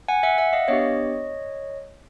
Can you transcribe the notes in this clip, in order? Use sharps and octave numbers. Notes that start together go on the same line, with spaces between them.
F#5 G#5
E5 F#5
E5 F#5
D#5 F5
B3 D4 G4 C#5 D#5